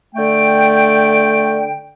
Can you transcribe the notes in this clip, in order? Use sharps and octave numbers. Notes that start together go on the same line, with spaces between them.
D3 A3 G5